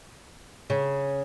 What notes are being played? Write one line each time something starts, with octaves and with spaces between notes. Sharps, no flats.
C#3